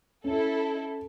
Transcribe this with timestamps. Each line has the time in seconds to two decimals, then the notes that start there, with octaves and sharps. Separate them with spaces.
0.24 C#4 E4 A4